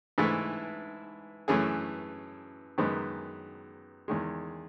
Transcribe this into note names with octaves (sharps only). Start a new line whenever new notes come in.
G#2 E3 A3 E4
F#2 E3 A3 C#4 G#4
F#2 D#3 G#3 B3
E2 D#3 G#3